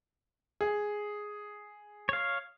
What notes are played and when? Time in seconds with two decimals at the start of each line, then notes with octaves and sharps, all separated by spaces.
0.61 G#4
2.09 C#5 F5